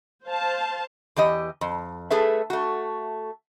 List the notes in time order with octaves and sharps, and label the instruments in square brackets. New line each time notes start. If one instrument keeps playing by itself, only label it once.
[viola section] C5 F5 A5
[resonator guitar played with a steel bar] E2 E3 G4 D#5
F2
A3 G#4 A4 B4 E5
A3 F#4